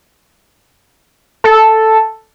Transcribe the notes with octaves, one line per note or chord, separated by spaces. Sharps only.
A4